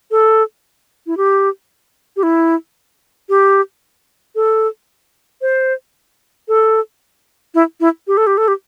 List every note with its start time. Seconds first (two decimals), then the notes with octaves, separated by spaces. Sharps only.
0.11 A4
1.07 E4
1.17 G4
2.16 G4
2.23 E4
3.29 G4
4.35 A4
5.42 C5
6.48 A4
7.55 E4
7.80 E4
8.07 G4
8.17 A4
8.27 G4
8.38 A4
8.48 G4